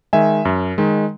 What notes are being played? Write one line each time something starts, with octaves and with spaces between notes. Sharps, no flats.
D#3 G#3 E5 G#5
F#2
D#3 G#3